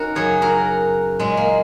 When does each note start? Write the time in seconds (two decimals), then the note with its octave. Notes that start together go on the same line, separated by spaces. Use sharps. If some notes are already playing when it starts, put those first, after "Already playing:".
Already playing: C#4 D#4 F#4 A#4
0.15 F#2 C#3 F#3 G#4 C#5
0.42 F#4 A#4
1.20 A#2 F#3 G#3 C#4
1.37 A#3